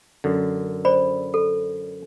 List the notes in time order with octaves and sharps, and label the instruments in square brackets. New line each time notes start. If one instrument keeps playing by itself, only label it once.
[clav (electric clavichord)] F#2 D3
[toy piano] C5 D5 B5
A4